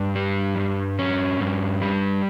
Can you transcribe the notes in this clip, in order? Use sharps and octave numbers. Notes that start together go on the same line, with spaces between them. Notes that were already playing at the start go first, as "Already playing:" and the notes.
Already playing: G2
G3
G2
C#4
G2
G3